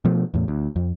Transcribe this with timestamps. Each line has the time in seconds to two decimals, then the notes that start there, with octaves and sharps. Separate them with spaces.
0.05 B2 F3 A3
0.34 E2 A2
0.48 D2
0.76 F2